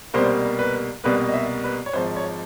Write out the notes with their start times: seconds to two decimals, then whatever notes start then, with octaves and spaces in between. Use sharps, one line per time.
0.14 C2 B2 G3 A#3 C5
0.59 B4
1.04 C2 B2 G3 A#3 B4
1.29 D#5
1.34 E5
1.64 B4
1.86 C#5
1.93 G#1 G#2 F3 C5
2.16 C#5